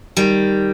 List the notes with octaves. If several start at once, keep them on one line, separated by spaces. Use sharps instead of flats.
D#3 G3